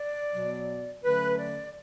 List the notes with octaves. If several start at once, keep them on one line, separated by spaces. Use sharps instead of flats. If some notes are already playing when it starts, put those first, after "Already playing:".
Already playing: D5
B2 F#3 B3
D3 F#3 A3 C#4 B4
D5